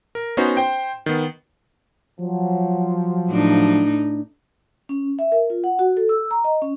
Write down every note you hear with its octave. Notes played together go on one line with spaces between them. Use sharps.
A#4
B3 C#4 D#4 F#4 C5
C5 G5
D#3 B3
F3 F#3
A2 D4 D#4
C#4
E5
A#4
F4
F#5
F#4
A4
E6
A#5
D#5
C#4